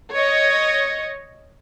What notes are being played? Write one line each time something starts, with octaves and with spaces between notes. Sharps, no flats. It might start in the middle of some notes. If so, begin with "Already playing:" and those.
C#5 D#5